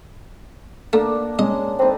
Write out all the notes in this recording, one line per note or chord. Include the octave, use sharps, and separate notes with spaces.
A3 A#3 D4
G#3 C#4 D#5
C4 D#4 A4 B4